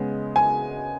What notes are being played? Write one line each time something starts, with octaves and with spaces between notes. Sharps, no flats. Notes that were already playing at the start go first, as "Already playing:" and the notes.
Already playing: C#3 G#3 B3
G#5